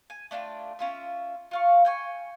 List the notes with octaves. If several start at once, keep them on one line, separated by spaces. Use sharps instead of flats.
G#5
A3 D4 F4 G5
C#4 F4 E5
F4 F5 C#6
G5 G#5 C#6